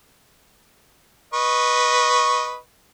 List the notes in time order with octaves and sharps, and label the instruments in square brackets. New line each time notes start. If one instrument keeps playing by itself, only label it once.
[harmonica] B4 D#5 C#6